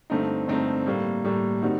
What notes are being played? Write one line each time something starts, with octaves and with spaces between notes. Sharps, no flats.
G2 D3 A3 C4 D#4
G2 D3 A3 C4 D#4
A2 G3 A#3
A2 G3 A#3
D#3 G3 C4 D#4 F#4